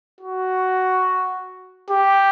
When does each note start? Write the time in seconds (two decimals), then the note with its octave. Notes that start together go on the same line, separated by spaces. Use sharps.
0.21 F#4
1.90 G4